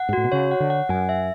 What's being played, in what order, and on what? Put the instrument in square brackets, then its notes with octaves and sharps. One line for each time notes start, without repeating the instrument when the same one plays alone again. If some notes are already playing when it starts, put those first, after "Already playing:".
Already playing: [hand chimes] F#5
[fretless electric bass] G#2
[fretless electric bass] A2 [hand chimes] F#4
[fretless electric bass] B2
[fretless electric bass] C#3 [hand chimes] C#5
[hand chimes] F#5
[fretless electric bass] D3
[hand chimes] F#5
[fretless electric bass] F#2 [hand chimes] G#5
[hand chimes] E5